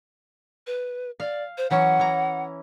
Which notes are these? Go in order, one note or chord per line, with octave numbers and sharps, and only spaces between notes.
B4
D5 F5
C5
E3 F#3 C#4 F#5
E3 A#5